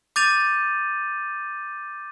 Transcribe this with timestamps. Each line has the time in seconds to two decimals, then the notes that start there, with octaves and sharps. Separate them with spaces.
0.16 D6 G6 A6 D#7 F7